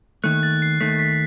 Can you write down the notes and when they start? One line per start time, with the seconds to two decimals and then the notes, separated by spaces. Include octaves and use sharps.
0.24 D#2 D#3 A3 F#6
0.43 A6
0.62 C7
0.81 D#2 D#3 A3 B6
0.99 B6